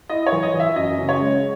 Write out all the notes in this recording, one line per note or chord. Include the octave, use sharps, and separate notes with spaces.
E4 D#5
C#5
E3
D#5
E3
E5
F#2 D#5
C#3
C#5
G#3